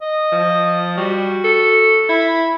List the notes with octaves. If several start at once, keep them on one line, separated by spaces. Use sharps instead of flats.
D#5
F3
G3 F#4
A4
E4 B5